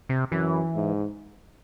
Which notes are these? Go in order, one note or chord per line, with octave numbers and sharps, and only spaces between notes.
C3
F#2 E3
G#2